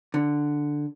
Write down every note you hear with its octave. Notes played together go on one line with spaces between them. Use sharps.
D3